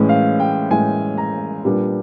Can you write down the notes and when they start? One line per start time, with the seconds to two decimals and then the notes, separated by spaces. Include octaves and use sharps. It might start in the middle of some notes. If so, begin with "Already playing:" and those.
Already playing: A2 E3 G#3 C#4
0.09 F5
0.40 G5
0.71 A2 E3 G#3 C#4 G#5
1.18 A#5
1.65 A#2 G3 B3 D4